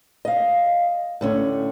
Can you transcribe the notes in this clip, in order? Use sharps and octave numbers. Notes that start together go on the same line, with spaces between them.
D#5 F5
A2 D3 C#4